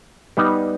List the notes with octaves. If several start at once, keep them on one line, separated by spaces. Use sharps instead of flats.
G3 B3 D#4